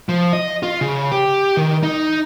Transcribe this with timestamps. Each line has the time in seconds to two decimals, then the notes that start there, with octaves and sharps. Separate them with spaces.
0.09 F3
0.33 D#5
0.63 F4
0.81 C#3
1.12 G4
1.57 D#3
1.83 D#4